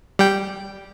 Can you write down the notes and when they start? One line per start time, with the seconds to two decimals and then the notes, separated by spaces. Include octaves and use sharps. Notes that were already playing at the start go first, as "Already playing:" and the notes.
0.19 G3 G5